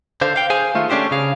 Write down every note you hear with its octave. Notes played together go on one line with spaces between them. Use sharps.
D3 C5 F5
F5 G5
G#4 C5 F5 G#5
D#3 A3 F4
A3 C#4 D4 G4 C5
C#3 G#4 F5